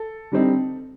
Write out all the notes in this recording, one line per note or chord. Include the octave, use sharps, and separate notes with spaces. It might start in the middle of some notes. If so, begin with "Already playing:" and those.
Already playing: A4
D3 G3 C4 D#4